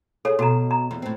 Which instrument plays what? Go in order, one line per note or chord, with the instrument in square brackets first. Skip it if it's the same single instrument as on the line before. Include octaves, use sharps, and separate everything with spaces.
[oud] G#4 [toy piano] A4 C#5
[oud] B2 [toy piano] F#4 A4 A#5
[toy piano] A#5
[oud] E2
A2 C4